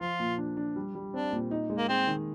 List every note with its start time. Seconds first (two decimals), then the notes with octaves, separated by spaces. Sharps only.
0.01 F3 F4
0.20 A#2
0.38 D4
0.57 D4
0.76 G3
0.95 G3
1.13 C4 D4
1.32 A#2
1.51 D#4
1.70 G#3
1.78 A#3
1.88 C4 G#4
2.07 D#3